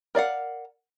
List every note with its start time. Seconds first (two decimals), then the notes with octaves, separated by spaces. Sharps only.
0.15 A#4 D5 F5 F#5